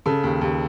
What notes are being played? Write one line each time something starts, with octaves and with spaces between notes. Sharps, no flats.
C#3 A4
D#2
D#2